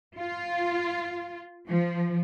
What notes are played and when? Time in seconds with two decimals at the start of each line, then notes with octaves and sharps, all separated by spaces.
0.19 F4
1.68 F3